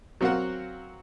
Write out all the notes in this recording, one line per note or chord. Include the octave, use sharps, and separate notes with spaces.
F#3 C4 F#4 A#4 F5 F#5